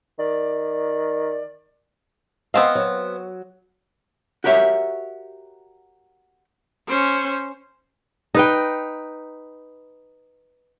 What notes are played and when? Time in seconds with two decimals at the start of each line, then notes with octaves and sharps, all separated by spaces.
0.19 D#3 D5
2.54 B3 C4 D#5 F5
2.75 F#3
4.44 F#4 G4 A#4 C#5 E5
6.88 C#4 C5
8.35 D#4 B4 G5